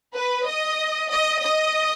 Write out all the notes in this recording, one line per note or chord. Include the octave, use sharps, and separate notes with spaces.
B4
D#5
D#5
D#5